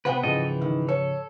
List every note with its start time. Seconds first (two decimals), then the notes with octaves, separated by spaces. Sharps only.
0.05 C3 B3 B4 C5 F#5 G5
0.23 G#2 C#3 E3 F3 A4 D#5
0.45 E3
0.62 D#3
0.89 A4 C#5